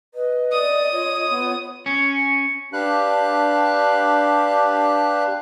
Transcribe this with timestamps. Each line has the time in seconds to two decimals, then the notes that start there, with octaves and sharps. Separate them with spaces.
0.14 B4 D#5
0.52 D5 D#6
0.92 F4 C#5
1.29 B3
1.86 C#4
2.73 D4 G4 B4 F5 F#6